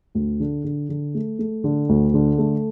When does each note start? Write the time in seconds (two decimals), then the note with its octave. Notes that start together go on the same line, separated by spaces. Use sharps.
0.15 D2
0.40 D3
0.64 D3
0.89 D3
1.15 A3
1.39 A3
1.64 D3
1.89 D2
2.14 D3
2.38 A3